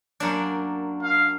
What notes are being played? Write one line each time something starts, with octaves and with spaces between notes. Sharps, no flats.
F#2 A#3 D4
F5